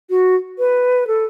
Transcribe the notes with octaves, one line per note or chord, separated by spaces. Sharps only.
F#4
B4
A4